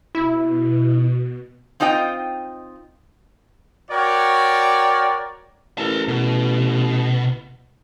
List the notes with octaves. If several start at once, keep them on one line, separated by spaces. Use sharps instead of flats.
B2 E4
C4 D#4 F4 D#5 G5
F#4 A#4 C#5 D5 G5
A1 A#4 A5
B2